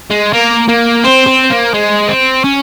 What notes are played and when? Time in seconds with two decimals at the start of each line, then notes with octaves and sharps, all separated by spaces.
0.10 G#3
0.33 A#3 A#4
0.69 A#3
1.04 C4 C5
1.27 C4
1.50 A#3
1.74 G#3
2.09 C4
2.44 C#4